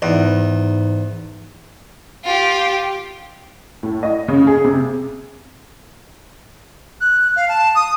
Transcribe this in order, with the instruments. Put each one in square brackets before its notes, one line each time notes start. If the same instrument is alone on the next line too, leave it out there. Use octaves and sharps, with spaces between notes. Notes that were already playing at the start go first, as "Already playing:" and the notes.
[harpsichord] E2 [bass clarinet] G#2
[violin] F4 G4
[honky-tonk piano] A2
D#5
C#3
G#4
C3
[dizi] F#6
F5
A5
D#6